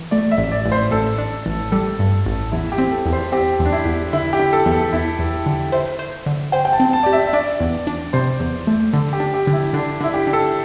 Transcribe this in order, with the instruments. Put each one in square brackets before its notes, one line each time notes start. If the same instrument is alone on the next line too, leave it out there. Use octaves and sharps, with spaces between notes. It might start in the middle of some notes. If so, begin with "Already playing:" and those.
Already playing: [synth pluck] E3
[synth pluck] A3 [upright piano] D5
[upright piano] E5
[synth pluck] A1
[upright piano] D5
[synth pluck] A1
[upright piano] C5
[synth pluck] A1 [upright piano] A4
[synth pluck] D4
A1
[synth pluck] G3 [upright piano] A4
[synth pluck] G2
A1
[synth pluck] E2 [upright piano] E4
[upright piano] G4
[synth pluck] C4
[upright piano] A4
[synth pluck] E2
[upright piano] C5
[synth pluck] C4 [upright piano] G4
[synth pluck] E2
[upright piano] D4
E4
[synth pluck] E2
[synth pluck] D3 [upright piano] E4
[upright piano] G4
[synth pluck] D3
[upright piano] A4
[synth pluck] E2
[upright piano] A4
[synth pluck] E2 [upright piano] E4
[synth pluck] E2
D3
[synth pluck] C5 [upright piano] E5
[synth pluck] C5
D3
[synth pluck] C5 [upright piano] G5
[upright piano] G5
A5
[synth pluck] C4
[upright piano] A5
[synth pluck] G4 [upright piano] D5
[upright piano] E5
E5
[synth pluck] D4 [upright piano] D5
[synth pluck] E2
D4
[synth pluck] C3 [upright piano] C5
[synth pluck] E2
A3
[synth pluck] D3 [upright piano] A4
[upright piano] G4
[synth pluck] D4
[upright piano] G4
[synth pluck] D3
[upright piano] E4
[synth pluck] D3 [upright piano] D4
[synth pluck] D3 [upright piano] E4
[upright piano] G4
[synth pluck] D3
[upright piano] A4